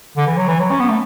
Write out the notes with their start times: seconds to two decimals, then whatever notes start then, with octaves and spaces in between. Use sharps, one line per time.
0.17 D3
0.27 E3
0.37 F#3
0.48 E3
0.60 F#3
0.71 C#4
0.80 B3
0.89 A3